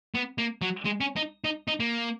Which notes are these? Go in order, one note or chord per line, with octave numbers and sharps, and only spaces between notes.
B3
A#3
F#3
G#3
C#4
D#4
D#4
D#4
A#3